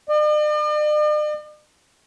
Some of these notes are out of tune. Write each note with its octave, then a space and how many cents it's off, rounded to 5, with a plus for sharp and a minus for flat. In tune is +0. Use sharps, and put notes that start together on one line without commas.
D5 +45